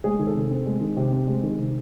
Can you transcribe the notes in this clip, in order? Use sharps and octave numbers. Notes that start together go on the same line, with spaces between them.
G#3 G#4
D#3
A4
C3
C4
G#3
D#3
C3 G4
C4
G#3
D#3
C3